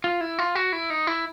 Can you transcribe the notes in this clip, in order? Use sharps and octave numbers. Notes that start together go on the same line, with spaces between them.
F4
E4
F4
F#4
E4
D#4
E4